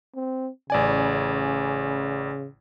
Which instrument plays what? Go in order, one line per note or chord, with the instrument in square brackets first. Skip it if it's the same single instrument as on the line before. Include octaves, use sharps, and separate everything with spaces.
[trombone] C4
[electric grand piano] A1 D5 G#5 [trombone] C#3